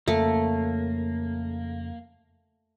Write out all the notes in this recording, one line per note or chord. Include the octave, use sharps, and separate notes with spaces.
F2 C#3 A3 A#3